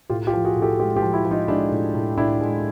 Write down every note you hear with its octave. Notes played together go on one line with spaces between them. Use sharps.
A2 F4 G4
F4 G4
F3
F#4 G#4
A2
G4 A4
G#3 F4 G4
F4 G4
F3
E4 F#4
F3
D#4 F4
G#3 D4 E4
A2
A2
A2 D4 E4
G#3